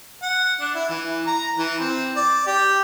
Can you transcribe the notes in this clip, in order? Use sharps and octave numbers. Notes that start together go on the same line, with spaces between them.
F#5
D4
E4
E3
A#5
E3
C4
D5
G4